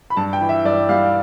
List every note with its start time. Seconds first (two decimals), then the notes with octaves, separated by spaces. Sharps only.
0.10 B5
0.16 G2 A5
0.33 G5
0.41 E3
0.49 E5
0.65 G2 D5
0.89 G3 F5